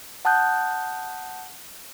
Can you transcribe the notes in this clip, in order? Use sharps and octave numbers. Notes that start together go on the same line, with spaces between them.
F#5 A5 D#6 F#6 G6